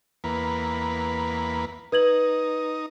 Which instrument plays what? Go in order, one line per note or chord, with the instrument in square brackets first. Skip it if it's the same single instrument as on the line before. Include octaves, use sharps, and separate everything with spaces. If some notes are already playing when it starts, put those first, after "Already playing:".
[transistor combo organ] E2 A#3 B4
[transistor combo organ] D#4 [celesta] B4 G#6 F#7